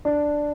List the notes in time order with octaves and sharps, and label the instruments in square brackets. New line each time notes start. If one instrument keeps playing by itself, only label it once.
[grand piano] D4